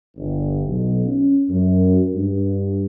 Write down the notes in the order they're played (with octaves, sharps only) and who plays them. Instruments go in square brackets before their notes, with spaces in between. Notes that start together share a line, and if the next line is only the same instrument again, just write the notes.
[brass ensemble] G1
B1
C#4
F#2
G2